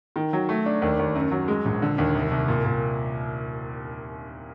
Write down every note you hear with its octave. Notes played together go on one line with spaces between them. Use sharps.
D#3
F#3
A3
D4
D#2
D#2
F#2
F#3
G#3
A#1
D3
D#2
C2
C2
A#2
A#2